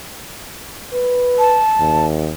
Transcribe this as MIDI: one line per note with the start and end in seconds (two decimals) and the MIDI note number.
0.93 1.60 71
1.39 2.07 81
1.79 2.34 39